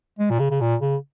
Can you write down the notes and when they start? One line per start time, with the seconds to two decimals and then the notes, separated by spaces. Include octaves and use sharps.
0.19 G#3
0.30 A#2
0.39 C#3
0.51 C#3
0.61 A#2
0.82 C#3